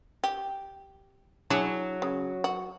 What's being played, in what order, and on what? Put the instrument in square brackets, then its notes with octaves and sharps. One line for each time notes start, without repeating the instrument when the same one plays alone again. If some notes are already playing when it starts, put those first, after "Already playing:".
[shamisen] G4
[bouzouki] F#3 [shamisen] D4 E4 G#4
[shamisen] C#3
F#4